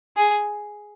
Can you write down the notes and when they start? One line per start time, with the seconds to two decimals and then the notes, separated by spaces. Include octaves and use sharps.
0.17 G#4